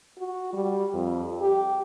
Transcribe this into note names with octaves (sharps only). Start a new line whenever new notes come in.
F#4
G3
F2
G4